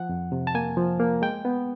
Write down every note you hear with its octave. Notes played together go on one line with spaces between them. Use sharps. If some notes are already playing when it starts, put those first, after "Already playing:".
Already playing: F3 F#5
F2
C3
A5
A#3 G#5
F3
A#3
G#3 G5
B3